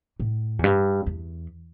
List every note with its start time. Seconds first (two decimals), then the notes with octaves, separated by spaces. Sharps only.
0.20 A2
0.59 E2
0.64 G2
1.06 E2